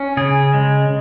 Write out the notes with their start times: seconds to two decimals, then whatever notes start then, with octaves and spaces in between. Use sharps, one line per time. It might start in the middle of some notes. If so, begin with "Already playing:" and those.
Already playing: C#4
0.17 C#3 G#4
0.54 G#3